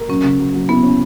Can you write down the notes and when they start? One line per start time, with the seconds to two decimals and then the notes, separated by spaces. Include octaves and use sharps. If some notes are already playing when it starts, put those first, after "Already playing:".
Already playing: A#4
0.09 F#3 C#4
0.24 C#3
0.39 F#3
0.54 F#3
0.69 B3 E4
0.83 C#4